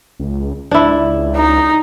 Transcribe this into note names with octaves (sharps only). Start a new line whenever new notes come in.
C#2
C#2 D4 E4
D#4